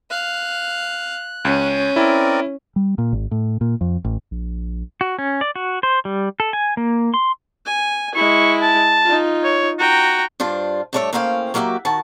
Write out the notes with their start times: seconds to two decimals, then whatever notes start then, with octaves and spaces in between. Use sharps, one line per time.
0.11 F5 F#6
1.45 C#2 C#4
1.96 C4 E4 A#4 D5
2.76 G3
2.98 A#2
3.13 G#1
3.31 A2
3.61 A#2
3.81 F2
4.04 A1
4.31 A#1
5.01 F#4
5.19 C#4
5.41 D5
5.56 F#4
5.83 C5
6.05 G3
6.40 A4
6.53 G#5
6.77 A#3
7.14 C6
7.66 G#5
8.15 G#3 E4 C#6
8.62 A5
9.05 D#4 F4
9.44 C#5
9.79 F#4 G5 A#5
10.40 G2 D4 F4 C5
10.93 G2 A3 D4 A#4 C#5 E5
11.13 A2 A#3 C#4 C5 F5 G5
11.54 F#3 A#3 F#4 G4 E5
11.85 D#3 F#4 A5